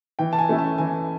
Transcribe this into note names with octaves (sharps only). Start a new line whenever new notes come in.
E3 G5
A5
G#5
A3 C#4 E4
A5
E3 G#5